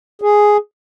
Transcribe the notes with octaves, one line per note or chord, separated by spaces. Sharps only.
G#4